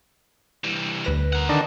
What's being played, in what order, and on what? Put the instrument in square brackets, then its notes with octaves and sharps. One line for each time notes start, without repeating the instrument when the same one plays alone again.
[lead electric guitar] E3 G3
[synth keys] D2 B4 A#6
[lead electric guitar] A#4 F#5
[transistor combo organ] D3 D#3 D4 [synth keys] D#5